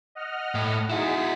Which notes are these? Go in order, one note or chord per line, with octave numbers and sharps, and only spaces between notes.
D#5 F#5 F6
A2
D#4 E4 F#4 G#4 B6